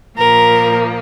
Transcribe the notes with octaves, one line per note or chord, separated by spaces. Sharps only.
A#2 F3 A#3 A#4